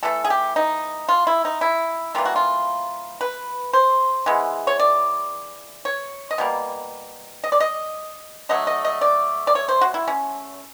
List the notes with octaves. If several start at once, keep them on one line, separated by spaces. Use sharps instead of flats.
E3 A3 A4
G#4
G4
D#4
F4
E4
D#4
E4
E3 G3 A#3 F4
F#4
F4
B4
C5
E3 G#3 B3
C#5
D5
C#5
D#5
B2 G3 A#3
D#5
D5
D#5
D3 F#3 A3 D#5
D#5
D#5
D5
D5
C#5
C5
F#4
E4
C#4